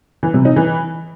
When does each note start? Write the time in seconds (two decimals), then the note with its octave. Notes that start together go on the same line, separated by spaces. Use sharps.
0.23 E3
0.34 C3
0.45 D#4
0.56 E3